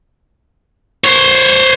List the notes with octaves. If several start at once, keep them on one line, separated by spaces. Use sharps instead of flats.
C5 C#5